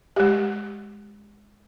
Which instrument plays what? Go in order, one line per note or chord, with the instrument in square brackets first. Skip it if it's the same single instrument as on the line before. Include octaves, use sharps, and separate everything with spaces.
[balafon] G#3 G4